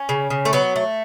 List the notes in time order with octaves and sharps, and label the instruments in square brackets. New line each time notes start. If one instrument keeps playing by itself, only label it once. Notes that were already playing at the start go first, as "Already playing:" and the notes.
Already playing: [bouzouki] C#4
C#3
C#3
A3
F#3 B3
A3